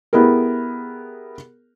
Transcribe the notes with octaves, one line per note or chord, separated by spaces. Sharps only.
B3 E4 G4 G#4 A#4